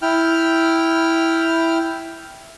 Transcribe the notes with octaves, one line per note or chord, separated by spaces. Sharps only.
E4 G5 F6